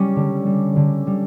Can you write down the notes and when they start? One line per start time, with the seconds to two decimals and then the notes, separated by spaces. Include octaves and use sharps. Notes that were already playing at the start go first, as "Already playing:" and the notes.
Already playing: G3 C#4
0.16 D3
0.46 G3
0.76 D3
1.07 G3